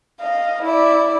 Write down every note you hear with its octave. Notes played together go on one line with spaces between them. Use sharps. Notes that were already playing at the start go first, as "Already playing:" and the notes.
D#5 F5
E4 D5